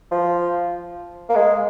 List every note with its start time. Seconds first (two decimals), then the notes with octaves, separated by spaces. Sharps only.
0.11 F3
1.30 A#3
1.35 G#3